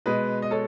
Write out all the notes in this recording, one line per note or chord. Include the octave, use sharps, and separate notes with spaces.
B2 G#3 B4 D#5
D#5
A4 C#5